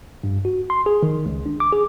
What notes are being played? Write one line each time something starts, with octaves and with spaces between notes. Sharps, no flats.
G2
F#4
C6
G#4
D#3
C#2
D4
D6
G#4